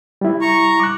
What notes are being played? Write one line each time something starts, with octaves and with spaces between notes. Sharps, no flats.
G3 E4
A#5 C#6
D6 F#6